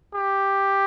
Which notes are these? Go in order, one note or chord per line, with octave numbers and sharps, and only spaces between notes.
G4